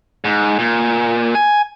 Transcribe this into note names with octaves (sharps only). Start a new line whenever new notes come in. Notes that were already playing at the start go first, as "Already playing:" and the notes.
G#2
A#2
G#5